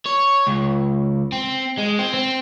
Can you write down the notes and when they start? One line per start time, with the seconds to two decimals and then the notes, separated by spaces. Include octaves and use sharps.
0.06 C#5
0.47 C#2
1.32 C4
1.78 G#3
1.99 C4
2.14 C4